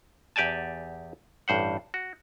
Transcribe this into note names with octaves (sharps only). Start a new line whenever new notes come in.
E2 G4 D5 G#5 A5
A1 G2 C5 F#5
F#4